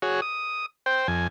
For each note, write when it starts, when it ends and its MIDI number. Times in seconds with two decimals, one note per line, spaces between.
0.02 0.21 66
0.02 0.21 68
0.02 0.21 73
0.22 0.66 87
0.86 1.07 72
0.86 1.07 79
1.08 1.27 41
1.08 1.27 80